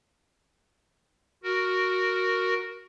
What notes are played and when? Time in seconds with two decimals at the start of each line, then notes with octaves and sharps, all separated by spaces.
1.43 F#4 A#4